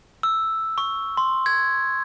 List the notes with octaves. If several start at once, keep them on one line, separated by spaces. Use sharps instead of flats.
E6
C#6
C6
G#6